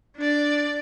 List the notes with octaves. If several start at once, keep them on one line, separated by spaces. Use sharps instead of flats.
D4 D5